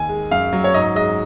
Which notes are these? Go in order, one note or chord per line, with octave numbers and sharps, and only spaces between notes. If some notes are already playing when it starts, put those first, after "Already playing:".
Already playing: D#2 G#5
G#3
F#2 F5
F#3
C#5
G#2 D#5
G#3 D#5